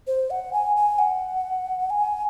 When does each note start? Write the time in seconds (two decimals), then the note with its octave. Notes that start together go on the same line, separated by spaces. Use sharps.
0.07 C5
0.30 F#5
0.53 G#5
0.76 G#5
0.99 F#5
1.90 G#5